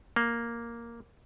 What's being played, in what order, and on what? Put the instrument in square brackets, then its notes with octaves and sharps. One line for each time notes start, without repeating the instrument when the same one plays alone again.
[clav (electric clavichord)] A#3